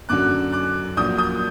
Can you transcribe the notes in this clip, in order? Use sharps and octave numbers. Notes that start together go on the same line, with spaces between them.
F#2 D3 F#3 D6 F#6
D6 F#6
A#1 A#2 F#3 D#6 G6
D#6 G6